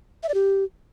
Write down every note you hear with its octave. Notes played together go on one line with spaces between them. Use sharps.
E5
D5
G4